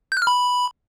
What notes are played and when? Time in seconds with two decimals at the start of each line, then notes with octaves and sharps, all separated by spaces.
0.12 G6
0.17 F#6
0.22 F6
0.27 B5